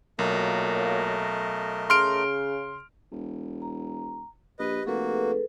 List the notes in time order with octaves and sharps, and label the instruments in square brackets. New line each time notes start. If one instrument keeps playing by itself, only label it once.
[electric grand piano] B1 [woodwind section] A#2 F#3 A#3 [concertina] A3 A#4 D#5
[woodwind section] C#3 [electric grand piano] C6 F6 D7
[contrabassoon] E1
[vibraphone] A#5
[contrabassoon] A#1 [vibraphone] G4 [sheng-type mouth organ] B4 D#5
[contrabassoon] F1 [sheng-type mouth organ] A#3 F#4 [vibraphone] G#4 A4 B4